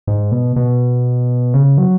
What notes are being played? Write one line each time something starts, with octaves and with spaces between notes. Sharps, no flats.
G#2
B2
B2
C#3
F#3